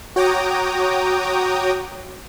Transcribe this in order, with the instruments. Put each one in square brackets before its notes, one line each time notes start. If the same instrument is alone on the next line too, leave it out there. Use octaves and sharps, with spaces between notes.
[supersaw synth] F#4 C#5 G5 A#5 D6 D#6